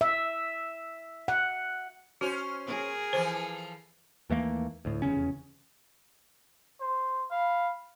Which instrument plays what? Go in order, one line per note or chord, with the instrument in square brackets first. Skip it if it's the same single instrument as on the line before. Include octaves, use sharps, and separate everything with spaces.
[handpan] E5
F#5
[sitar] C#4 C5 [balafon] F#4
[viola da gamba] G#4 A#4
[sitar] E3 F3 A4 [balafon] C5
[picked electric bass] D#2 E3 A3 A#3
D2 A2
F1 E2 C#3 C#4
[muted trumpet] C5
[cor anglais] F5 [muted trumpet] B5